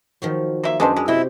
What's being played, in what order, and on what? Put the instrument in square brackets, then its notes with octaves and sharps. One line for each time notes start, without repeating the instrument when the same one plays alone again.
[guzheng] D#3 F3 F#3
[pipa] A#3 E5 [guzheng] C6
[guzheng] F#2 E5 [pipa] G#3 B3 C4 [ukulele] D4 D#5 A5
[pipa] G#3 [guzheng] B4
[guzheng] C3 G5 [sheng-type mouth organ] E4 [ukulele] D#5 E5